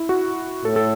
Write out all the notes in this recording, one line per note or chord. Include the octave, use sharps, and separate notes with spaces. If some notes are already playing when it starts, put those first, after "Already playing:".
Already playing: E4
F#4
A2 A4
A4